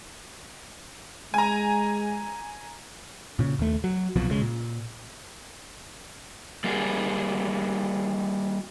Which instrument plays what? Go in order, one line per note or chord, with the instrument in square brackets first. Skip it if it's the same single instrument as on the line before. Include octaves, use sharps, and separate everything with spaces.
[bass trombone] G#3 [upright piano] G#5 A#5
[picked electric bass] A#2 C#3
D#2 A3
F#3
C2 B2 F3 F#3
E1 C#3 G#3
A#2
[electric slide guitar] G3 A#3 F#4 G#4